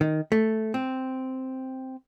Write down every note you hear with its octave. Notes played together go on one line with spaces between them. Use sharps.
D#3
A3
C4